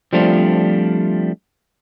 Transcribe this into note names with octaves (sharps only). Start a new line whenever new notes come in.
F3 G3 A3 C4 D4 F4